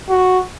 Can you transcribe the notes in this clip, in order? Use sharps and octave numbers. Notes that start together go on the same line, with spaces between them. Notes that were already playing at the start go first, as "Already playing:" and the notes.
F#4